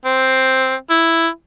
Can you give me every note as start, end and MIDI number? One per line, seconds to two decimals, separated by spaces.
0.05 0.75 60
0.90 1.28 64